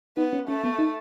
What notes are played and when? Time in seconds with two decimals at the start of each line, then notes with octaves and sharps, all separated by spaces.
0.17 B3 D#4
0.33 C#4
0.48 A3 C#4
0.64 B3
0.78 D#4